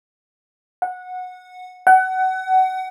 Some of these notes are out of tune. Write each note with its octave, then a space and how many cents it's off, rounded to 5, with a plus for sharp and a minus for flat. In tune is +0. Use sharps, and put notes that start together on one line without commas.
F#5 -15
F#5 +25